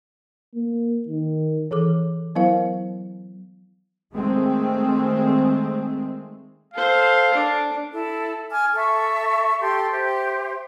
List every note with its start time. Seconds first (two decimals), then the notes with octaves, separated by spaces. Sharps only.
0.55 A#3
1.09 D#3
1.71 E3 G#4 A4 D6
2.35 F#3 B3 E4 A#4 C5 F5
4.14 D#3 G#3 A3 C4
6.74 A4 C5 F5
7.34 D4 D5
7.92 E4 A4
8.51 G#5 D6 F6
8.74 A4 E5 C#6
9.60 G4 A4 C6
9.91 G4 C5 E5